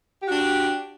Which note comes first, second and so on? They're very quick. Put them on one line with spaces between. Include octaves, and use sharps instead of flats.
G4 F#4 D4